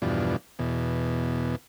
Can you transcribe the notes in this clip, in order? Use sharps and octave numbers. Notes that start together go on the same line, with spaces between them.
E2 G2 B2 F3 D4
E2 B2